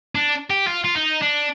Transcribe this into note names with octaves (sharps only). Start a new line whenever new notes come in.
D4
G4
F4
F4
D#4
D4